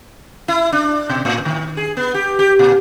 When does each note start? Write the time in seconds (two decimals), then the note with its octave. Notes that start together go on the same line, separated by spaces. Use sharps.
0.48 E4
0.72 D4
1.10 B2
1.25 A2
1.45 D#3
1.77 G#4
1.97 B3
2.14 G4
2.39 G4
2.59 A#2